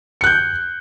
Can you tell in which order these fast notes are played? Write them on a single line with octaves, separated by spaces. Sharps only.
C#7 F#6 G6